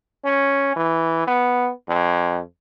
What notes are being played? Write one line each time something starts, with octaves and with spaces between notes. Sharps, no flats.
C#4
E3
B3
F2